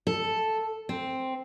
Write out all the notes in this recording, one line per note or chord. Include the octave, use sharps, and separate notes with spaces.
A4
C4